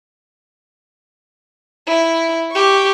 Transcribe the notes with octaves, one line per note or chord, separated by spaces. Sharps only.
E4
G4 C#6